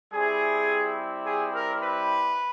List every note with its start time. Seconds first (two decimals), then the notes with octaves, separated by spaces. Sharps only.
0.12 G3 C4 E4 G#4
1.26 G#4
1.54 A#4
1.82 B4